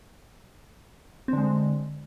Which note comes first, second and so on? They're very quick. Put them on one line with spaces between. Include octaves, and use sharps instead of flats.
C4 D3 G#3